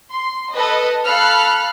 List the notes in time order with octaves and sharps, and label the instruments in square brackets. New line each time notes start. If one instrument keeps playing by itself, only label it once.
[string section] C6
A4 B4 D#5
A4 F5 B5 F6 F#6